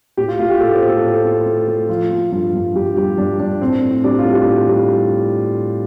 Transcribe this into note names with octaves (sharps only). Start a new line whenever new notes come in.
A2 G4
F4
A2 F4
G4
A2 A4
C5
A3
A4
A2
A3
A3
A3
F3 F4
A3
G2 F4
G2
G2 G4
G2 G4
G2 D4
G2 D4
A2 C4
A2
G3 D4
F4
A2
G4
A2
G3